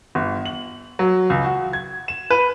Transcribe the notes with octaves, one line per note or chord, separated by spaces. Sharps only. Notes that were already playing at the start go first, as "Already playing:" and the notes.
G1
F#7
F#3
C#2
F#4
G#6
E7
B4